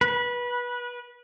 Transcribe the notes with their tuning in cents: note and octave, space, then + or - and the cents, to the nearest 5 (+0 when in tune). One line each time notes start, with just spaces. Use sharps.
B4 -20